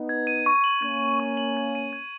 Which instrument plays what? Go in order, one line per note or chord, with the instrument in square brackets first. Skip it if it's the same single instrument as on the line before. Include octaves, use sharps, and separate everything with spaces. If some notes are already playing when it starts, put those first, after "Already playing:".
Already playing: [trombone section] B3 D#4
[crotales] G#6
D#7
C#6
F#7
[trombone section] A#3 C#4 [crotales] G#6
[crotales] D#7
C#6
F#7
G#6
D#7
G#6